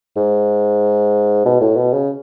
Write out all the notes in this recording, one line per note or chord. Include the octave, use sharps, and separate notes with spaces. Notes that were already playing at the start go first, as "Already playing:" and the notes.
G#2
B2
A2
B2
C#3